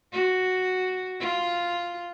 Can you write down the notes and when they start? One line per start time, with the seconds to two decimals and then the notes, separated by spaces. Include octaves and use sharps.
0.12 F#4
1.20 F4